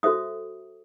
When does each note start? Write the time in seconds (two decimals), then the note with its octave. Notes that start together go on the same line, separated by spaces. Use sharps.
0.03 F#4 A4 C5 E5 D#6